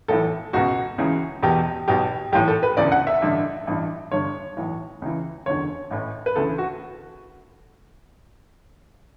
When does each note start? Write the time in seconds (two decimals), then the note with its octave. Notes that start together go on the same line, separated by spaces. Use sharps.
0.08 B1 A2 E3 A4
0.53 C#2 B2 F#4
0.98 C#2 C#3 E3
1.42 E1 E2 B2 G4
1.88 B1 B2 G4
2.32 B1 A2 E3 G4
2.48 A4
2.63 B4
2.77 E1 D2 C#3 E3 D5
2.92 F#5
3.07 E5
3.22 A1 G2 D3
3.67 A1 G2 E3
4.12 G1 G2 D3 C#5
4.57 B1 A2 E3
5.02 C#2 C#3 E3
5.46 F#1 E2 D3 C#5
5.91 A1 A2 E3
6.26 B4
6.36 D2 C#3 E3 A4
6.58 F#4